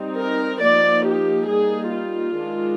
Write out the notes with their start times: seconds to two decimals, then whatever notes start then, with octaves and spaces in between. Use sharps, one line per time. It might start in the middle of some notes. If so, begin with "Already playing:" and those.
Already playing: G3 C4 D#4
0.19 A#4
0.62 F3 A#3 D#4 D5
1.06 G4
1.48 G3 A#3 D#4 G#4
1.92 F4
2.36 D#3 G#3 D4